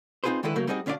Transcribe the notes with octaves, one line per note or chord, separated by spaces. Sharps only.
C4 D#4 F4 G#4 B4 C5
D3 D#3 G#3 E4 A4 B4
C#3 F#3 A3 A#3 A#4
G3 C4 D#4 F#4 G#4 D#5
D2 C#4 D4 E4 D5 F5